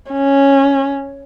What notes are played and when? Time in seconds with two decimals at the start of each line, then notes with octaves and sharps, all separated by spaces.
0.11 C#4